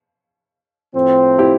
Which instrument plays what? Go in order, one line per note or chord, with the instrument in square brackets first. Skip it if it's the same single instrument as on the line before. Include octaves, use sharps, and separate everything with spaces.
[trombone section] A2 F3 C4
[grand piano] E4 G4